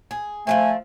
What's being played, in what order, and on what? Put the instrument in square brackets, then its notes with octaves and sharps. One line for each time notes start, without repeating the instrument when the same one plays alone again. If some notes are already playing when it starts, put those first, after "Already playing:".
[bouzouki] G#4
[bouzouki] F3 F#3 C4 [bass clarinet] A3 [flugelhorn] G#5